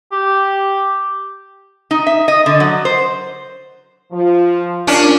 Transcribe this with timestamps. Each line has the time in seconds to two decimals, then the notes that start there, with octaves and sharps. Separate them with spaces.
0.12 G4
1.91 D#4
2.07 E5
2.28 D#5
2.46 D3
2.60 F#3
2.85 C5
4.11 F3
4.87 F3 G3 A#3 C#4 D4